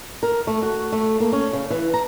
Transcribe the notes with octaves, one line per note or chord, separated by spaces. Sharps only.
A#4
A3
F#4
A3
A#3
C#4
C#3
E3
A#5